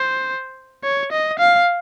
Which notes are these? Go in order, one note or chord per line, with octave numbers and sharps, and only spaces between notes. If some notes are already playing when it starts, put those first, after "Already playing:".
Already playing: C5
C#5
D#5
F5